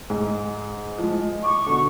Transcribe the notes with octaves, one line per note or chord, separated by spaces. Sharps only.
G#2 G#4
F3 G#3
C#6 D6
B2 D3